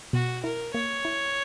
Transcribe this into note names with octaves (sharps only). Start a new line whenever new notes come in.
B2 F#4
E4 A#4
A#3 C#5
E4